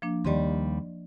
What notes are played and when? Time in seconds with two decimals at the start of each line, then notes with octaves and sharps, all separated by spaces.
0.02 F3 A#3 D4
0.25 D#2 G3 D5 D#5 C6